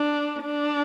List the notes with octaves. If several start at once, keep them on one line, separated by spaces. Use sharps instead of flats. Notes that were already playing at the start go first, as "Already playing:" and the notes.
Already playing: D4
D4